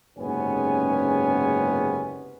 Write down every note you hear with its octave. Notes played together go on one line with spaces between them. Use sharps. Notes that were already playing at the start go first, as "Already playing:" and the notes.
F#1 G#2 C3 B3 C#4 G#5